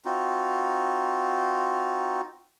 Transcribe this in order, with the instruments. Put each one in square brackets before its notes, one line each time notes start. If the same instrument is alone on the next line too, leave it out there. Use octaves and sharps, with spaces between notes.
[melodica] C4 D#4 F4 F#4